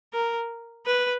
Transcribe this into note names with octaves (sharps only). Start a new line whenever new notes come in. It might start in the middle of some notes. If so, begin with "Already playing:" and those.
A#4
B4